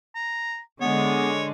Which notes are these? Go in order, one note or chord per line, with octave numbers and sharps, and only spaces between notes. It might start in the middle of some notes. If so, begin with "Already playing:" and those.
A#5
D3 G#3 B3 C#5